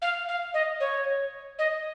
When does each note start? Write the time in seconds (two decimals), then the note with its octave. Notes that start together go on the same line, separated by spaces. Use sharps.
0.02 F5
0.28 F5
0.54 D#5
0.80 C#5
1.59 D#5